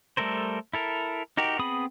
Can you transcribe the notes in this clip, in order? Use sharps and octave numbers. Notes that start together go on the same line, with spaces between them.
G3 A3 A4 A#4 C5
E4 A4 A#4
D#4 F#4 G4 A#4
B3 C4 G#4 B5 D#6